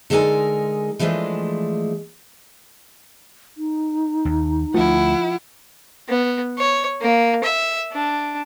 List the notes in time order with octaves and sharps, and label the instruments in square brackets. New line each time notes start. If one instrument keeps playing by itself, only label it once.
[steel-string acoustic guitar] D3 G#3 D#4 A4 A#4 G#5
E3 F3 G#3 A3 D4
[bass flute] D#4
[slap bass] D#2
[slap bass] D2 A3 [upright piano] F3 [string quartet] E4 F#5
[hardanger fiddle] B3
C#5
A#3
E5
D4